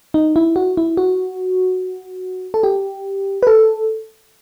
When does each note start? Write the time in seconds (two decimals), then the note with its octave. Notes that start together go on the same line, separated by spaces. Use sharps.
0.14 D#4
0.36 E4
0.56 F#4
0.77 E4
0.97 F#4
2.54 A4
2.63 G4
3.43 B4
3.47 A4